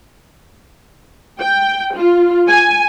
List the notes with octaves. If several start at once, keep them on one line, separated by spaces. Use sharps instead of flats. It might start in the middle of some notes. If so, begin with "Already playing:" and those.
G5
F4
G#5